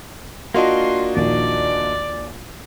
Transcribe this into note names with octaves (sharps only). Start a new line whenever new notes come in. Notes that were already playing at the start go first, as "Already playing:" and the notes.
A#3 D4 F4 F#4 D#5 C6
A#1 D#2 D5